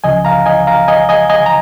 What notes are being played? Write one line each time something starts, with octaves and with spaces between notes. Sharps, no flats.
C#2 C#3 F3 D#5 G#5
F5 A#5
D#5 G#5
F5 A#5
D#5 G#5
D#5 G#5
D#5 G#5
A#5